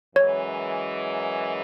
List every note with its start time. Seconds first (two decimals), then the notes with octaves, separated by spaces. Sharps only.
0.15 F#2 E3 G#3 C#5